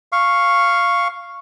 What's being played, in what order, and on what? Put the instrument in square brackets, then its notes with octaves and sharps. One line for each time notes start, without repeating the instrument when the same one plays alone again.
[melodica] F5 C#6